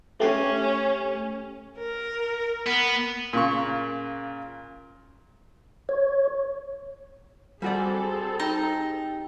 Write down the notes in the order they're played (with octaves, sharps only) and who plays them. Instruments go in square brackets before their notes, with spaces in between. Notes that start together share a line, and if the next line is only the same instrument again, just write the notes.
[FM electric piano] A3 G4 [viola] C#4
[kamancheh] A#4
[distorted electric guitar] B3
[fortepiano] A#2 C#3 C#6
[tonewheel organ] C#5
[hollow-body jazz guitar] G3 F#4 D5 [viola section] C4 G#4 A4 [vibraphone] G#5
[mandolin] D#4 [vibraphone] G4 G5